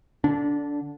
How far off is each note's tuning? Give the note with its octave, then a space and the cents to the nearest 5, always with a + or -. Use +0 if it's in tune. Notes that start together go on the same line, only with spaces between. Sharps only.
D3 +0 D4 -20